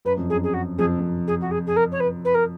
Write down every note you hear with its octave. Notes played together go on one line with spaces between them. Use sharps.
F#2 B4
F2
F#2 G#4
G#4
F#4
F2 G#4
F2
G#4
F#4
G#4
G#4
A#4
C#5
B4
B4
A#4